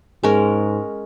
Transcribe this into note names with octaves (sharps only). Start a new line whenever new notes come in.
G#2 G#3 C#4 A#4